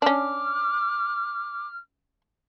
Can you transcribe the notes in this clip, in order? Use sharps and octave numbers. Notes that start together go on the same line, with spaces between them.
C#4 D4 D6 F6